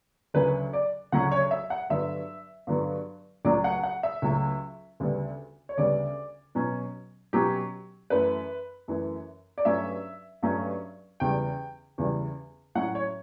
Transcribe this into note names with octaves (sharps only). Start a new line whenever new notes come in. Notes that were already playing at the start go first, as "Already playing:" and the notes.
D2 C#3 F#3 C#4 B4
D5
D2 C#3 F#3 C#4 F#5
C#5
E5
F#5
G2 D3 F#3 B3 E5
G2 D3 F#3 B3
C#2 C#3 F#3 A3 D5
F#5
F#5
E5
C#2 C#3 F#3 A3
D2 C#3 G3 B3
C#5
D2 C#3 G3 B3 D5
B2 F#3 C#4
B2 F#3 C#4 G4
F#2 E3 A3 B4
F#2 E3 A3
D5
G2 F#3 A3 C#4 E5
G2 F#3 A3 C#4
E2 C#3 E3 G3 G5
E2 C#3 E3 G3
A2 F#3 C#4 F#5
C#5